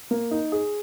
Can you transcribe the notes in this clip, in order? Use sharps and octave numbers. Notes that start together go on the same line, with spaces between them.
A#3
D#4
G#4